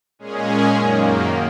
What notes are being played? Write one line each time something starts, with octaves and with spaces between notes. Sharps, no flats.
A#2 G#3 C#4 G#4
F#2 D#3 A#3